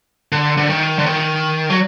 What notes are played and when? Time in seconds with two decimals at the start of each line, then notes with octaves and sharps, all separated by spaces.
0.32 D3
0.57 D3
0.70 D#3
0.99 D3
1.06 D#3
1.70 F#3